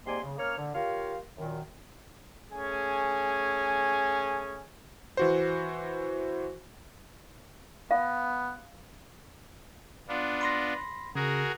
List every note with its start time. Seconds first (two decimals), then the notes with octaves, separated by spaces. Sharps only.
0.06 G#2 C3 A#3 D5 G#5 C6
0.23 C#3
0.38 A#3 C#4 C#5 F6
0.57 D3
0.75 F4 G4 A#4 C#5 F5
1.37 F#2 A#2 D#3
2.51 A3 C#4 G#4 G#5
5.17 E3 F#4 C5
7.91 B3 F5
10.09 B3 D4 F4
10.41 B5 C6 A#6
11.15 C#3 F#4 G#4 A#4